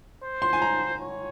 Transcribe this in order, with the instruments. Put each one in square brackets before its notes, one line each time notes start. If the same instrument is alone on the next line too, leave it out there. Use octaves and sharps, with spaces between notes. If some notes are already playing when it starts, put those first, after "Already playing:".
[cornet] C5
[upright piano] C6
G#5
A#5
[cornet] C#5